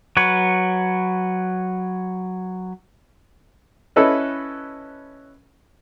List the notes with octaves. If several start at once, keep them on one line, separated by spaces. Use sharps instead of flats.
F#3 B4 C#5
C#4 E4 A4 B4 D#5